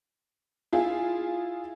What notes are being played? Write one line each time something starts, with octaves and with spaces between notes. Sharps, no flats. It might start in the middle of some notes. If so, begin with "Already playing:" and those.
E4 F4 G#4